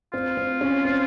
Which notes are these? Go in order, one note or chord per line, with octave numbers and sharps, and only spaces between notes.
C4 F4
C4
C#4
C4